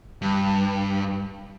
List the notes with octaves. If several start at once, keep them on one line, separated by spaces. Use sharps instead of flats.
G2